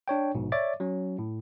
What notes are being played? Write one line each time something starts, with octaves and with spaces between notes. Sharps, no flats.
D4 C#5 G5
A#1 G#2 B2
C#5 D5 E5 D6 A6
F#3 C#4
A2